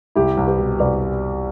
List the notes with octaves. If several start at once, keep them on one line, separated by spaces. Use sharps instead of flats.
C2 E4 G4
C2
G4 B4
B2
C2 B4 D5